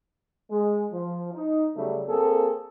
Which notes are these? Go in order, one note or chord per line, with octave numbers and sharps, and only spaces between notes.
G#3
F3
D#4
C#3 F#3 G3 A3
A#3 C4 G#4 A4